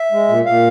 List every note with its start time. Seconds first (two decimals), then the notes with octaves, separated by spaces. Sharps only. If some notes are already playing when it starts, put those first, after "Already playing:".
Already playing: E5
0.12 G#3
0.28 A#2
0.45 A#2 F5